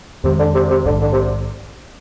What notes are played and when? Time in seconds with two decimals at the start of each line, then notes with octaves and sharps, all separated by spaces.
0.24 F2 C3 D#3 G#3
0.39 D3
0.54 C3
0.70 C3
0.85 A#1 G#2 D3 D#3
1.01 D3
1.12 C3